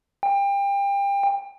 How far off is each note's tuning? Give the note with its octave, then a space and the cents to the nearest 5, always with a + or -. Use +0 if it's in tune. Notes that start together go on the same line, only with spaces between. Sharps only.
G5 +30